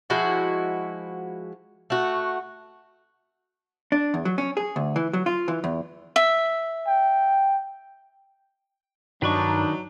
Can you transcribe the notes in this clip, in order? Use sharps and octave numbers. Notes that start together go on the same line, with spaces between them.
F3 G#3 E4 F#4
A3 F#4
D4
E2
F#3
C#4
G#4
D2
E3
F#3
F4
E3
E2
E5
G5
G2 D#3 F#3 D4 D#4 B4 C#6